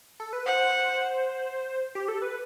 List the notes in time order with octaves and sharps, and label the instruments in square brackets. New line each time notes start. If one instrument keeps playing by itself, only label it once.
[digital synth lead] A4
B4
[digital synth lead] C5 [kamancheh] F#5
[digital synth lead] G4
A4
B4